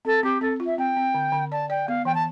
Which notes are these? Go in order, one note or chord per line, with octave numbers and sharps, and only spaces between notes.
C4 A4
C4 G4
C4 A4
F4
E5
C4 G5
C4
D3
D3
D5 A5
D5 G5
B3 F5
E3 G5
A5